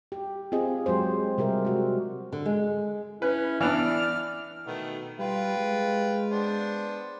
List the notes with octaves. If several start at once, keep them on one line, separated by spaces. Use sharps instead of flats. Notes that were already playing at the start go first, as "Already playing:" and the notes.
G4
C4 F4 G#4 D#5
F#3 G#3 G4 C5
C3 G3 G4 A#4 E5
G#3 F#4
D3
G#3
C#4 E4 B4
E3 B3 D4 D5 F6
B2 D#3 A3 B3
G3 F4 B4 G5
G#3
B3 D4 C5